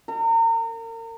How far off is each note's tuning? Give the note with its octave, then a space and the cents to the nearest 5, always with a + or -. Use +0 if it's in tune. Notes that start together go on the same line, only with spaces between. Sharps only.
A#4 -35